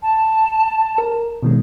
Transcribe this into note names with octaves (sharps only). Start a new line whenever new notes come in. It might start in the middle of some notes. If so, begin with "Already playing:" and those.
A5
A#4
B2 D#3 G#3